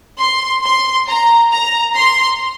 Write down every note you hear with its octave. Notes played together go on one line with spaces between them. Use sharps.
C6
C6
A#5
A#5
C6